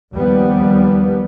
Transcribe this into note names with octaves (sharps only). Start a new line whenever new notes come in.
D#2 F3 G3 B3